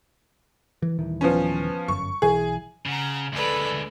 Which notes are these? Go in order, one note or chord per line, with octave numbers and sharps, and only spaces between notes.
E3
D#1 D#3 E3
F3 B3 C#4
G1 F#2 C#6
B1 E3 G#4
C#3 F#5 A#5
D2 G#3 A4 B4 D5